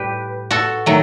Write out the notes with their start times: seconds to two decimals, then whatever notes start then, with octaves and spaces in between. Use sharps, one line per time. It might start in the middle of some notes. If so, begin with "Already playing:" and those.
Already playing: A2 G3 G4 B4
0.51 F#4 A4
0.86 D#3 F#3 A3